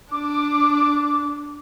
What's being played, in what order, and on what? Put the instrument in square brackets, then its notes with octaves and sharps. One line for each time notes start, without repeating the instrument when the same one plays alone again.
[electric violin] D4 [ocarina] D6